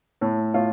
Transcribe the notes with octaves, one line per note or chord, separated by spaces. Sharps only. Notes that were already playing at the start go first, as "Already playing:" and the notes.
A2
A2 F4